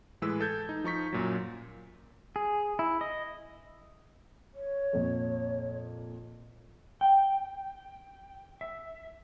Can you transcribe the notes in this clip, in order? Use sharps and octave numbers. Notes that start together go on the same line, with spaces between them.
A2 E3 G#3 B4 E6
A4 G6 G#6
D#4
F3 D#4 C#6 B6
F#2 A#2 F#3
G#4
E4
D#5
C#5
F2 A#2
G5
E5